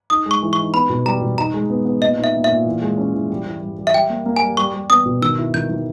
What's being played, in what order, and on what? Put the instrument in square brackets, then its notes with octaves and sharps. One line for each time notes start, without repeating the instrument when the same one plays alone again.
[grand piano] D#4 [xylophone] D#6
[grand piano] G#3
[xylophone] C#6
[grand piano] E3
[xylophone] C#6
[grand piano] D#4
[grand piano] B3 [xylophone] B5
[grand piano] B2
[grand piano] G3 [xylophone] A#5
[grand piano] B2
[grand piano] D#4 [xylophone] A#5
[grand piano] G#3
B3
B3
[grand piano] A#2 [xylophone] D#5
[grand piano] D#4
[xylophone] E5
[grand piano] A#2
[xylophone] E5
[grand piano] A#2
E3
G#3
C#4
E3
G3
E3
G3
G3
[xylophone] E5
[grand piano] G3 [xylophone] G5
[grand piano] A#3
A#3
[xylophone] G#5
[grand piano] G3
[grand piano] G3 [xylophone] C#6
[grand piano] G3
[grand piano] B3 [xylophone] D#6
[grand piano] B2
[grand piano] D#3 [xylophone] E6
[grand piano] E4
[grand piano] D#3 [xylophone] G6
[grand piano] D#3